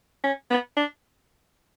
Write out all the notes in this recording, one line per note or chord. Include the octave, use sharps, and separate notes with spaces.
C#4
B3
D4